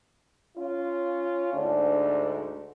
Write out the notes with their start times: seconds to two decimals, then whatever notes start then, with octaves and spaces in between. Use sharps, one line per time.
0.57 C#4 F4
1.54 D2 G#2 D4